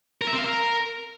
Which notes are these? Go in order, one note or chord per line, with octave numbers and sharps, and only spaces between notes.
A#4
E5
C4
F5
A#4